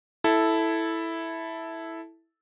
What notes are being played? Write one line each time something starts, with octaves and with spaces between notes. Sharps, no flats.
E4 A4